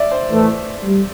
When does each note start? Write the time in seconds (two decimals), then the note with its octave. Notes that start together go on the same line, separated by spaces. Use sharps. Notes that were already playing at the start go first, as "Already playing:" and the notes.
Already playing: D5 E5
0.12 C5
0.29 A2 E3 A3
0.82 G3